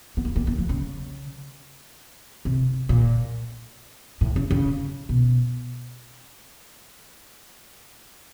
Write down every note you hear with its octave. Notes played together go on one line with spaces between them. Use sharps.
B3
A#3
A#3
A#3
F3
C#3
C3
A#2
A2
C#3
C#3
B2